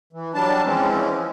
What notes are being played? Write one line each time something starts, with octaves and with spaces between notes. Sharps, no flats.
E3
F#3 G3 D4 A5
E3 F3 G#3 C4 C#4